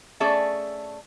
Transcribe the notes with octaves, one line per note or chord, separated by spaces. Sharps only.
A3 C#4 G#4 D5 E5 A5